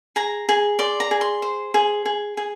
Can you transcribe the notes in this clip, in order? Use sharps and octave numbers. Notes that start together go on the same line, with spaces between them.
G#4 A#5
G#4
D5 C6
A#5
G#4
C6
C5
G#4
G#4
G#4